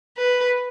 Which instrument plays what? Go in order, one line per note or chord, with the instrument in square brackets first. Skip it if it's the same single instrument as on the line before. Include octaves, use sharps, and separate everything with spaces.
[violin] B4